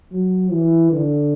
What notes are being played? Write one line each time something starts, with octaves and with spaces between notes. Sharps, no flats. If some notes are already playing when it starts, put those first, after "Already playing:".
F#3
E3
D3